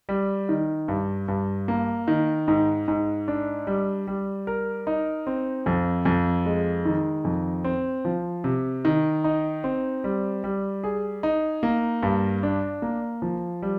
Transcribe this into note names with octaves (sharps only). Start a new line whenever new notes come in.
G3
D#3
G2
G2
A#3
D#3
G#2
G#2
D4
G3
G3
A#4
D#4
C4
F2
F2
G#3
D#3
F2
C4
F3
C3
D#3
D#4
C4
G3
G3
G#4
D#4
A#3
G2
D4
A#3
F3
G3